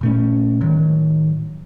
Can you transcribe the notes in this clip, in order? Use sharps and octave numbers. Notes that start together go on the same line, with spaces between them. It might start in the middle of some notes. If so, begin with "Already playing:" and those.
A#2 A3 C#4
A2 D#3 F#3